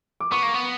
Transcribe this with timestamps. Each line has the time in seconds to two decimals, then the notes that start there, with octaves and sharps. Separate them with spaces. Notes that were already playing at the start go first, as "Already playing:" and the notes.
0.20 D6
0.32 B3 C#6
0.43 A#3
0.54 B3